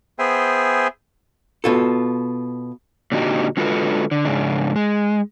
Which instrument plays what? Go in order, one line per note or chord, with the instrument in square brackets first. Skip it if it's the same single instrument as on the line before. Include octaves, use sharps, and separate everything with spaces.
[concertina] B3 G#4 C5 E5 G5 G#5
[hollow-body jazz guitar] B2 F4 A4
[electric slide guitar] A#2 D3 G#3 D#4 F#4 G4
D3 G#3 F4 F#4 A4 B4
D3
G#2 C#3 D4
G#3